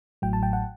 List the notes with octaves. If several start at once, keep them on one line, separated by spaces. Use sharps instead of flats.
A1 A2 F#3 G5
A5
G5
F#5